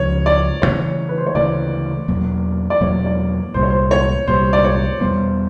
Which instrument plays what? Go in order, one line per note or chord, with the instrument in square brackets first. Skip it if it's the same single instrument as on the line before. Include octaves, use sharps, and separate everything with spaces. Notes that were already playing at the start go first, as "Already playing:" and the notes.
Already playing: [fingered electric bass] C#2 C#3 F3 [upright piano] C#5
[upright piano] D5
[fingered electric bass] D2 C#3 E3 A3 [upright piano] C#5
[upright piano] B4
C5
C#5
[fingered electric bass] D2 C#3 E3 A3 [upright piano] D5
[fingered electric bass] E2 B2 F#3 A#3
[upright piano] D5
[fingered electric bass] E2 B2 F#3 A#3 [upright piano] C#5
[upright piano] D5
[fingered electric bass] C2 A#2 G3 [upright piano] C5
[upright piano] C#5
C5
C#5
[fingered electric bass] C2 A#2 G3 [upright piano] C5
[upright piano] D5
C#5
[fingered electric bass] E2 B2 G3 B3 [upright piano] C5